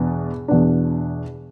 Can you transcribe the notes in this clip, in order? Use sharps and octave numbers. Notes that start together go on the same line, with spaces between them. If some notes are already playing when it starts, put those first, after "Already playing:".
Already playing: E2 B2 B3 D4
E2 B2 B3 D4